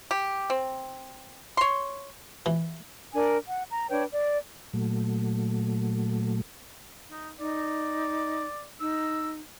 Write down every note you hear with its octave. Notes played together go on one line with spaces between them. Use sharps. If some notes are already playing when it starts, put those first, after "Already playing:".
G4
C4
C#5 C6
E3
D4 A#4 G#5
F#5
A#5
D4 B4 C#5 G5
D5
A#2 F#3 A3
D#4
D#4 D5
D#4 E6